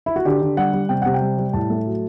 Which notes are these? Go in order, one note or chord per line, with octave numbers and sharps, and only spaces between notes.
E4
F#4
D3 G4
D3
G3 F#5
G3
C3 G5
C3 F#5
G5
G3
G3
A2 A5
A3
F#3